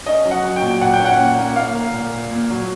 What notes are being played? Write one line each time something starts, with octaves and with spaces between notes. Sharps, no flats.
C#4 D#5
F#3
F#5
F#3
G5
A#2
A#2 F#5
G5
C#4
F#5
A#2
A#3
A#3 F5
A#3
A#2
A#2
A#2
F#3